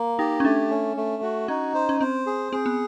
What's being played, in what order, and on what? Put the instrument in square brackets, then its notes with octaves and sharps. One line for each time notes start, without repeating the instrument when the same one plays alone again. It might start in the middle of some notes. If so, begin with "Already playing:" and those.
Already playing: [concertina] A#3
[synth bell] D#4 [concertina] G4
[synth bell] C#4
[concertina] A3 [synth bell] D4
[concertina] C#4
A3
F#4
[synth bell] C#4 [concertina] D#4
[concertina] C5
[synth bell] C#4
[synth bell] C4 [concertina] C5
[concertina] G#4
[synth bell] C4 [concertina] G#4
[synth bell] B3